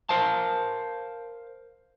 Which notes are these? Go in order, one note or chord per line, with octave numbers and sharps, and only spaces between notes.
A#4 C5 F5 A5